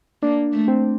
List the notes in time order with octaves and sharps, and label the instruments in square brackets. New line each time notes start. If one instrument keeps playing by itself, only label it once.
[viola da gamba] A#3 [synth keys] D4
[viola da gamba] A3
[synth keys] C4